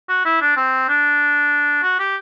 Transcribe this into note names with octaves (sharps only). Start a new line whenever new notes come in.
F#4
E4
D4
C4
D4
F#4
G4